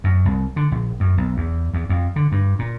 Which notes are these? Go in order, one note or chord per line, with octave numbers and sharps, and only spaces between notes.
F#2
C2
D3
A#1
F#2
B1
E2
E2
F2
D3
G2
A#2